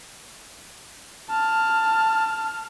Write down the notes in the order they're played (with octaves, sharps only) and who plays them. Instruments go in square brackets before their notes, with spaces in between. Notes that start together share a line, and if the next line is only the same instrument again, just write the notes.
[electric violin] A5 F6